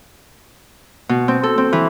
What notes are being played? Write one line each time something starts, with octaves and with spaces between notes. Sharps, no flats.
B2
C4
A4
C4
E3